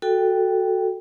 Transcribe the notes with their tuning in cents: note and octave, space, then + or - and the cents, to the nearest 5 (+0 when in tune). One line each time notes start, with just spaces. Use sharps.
F#4 +0 A4 +0 G5 +0